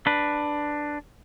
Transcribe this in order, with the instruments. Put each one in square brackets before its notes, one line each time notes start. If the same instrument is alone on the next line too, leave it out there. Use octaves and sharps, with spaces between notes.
[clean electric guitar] D4 B4